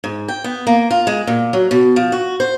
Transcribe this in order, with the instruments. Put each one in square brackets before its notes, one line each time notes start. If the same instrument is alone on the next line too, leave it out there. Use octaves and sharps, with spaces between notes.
[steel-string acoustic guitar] G#2
G5
B3
A#3
F4
G#3
A#2
F#3
B2
F3
F#4
C5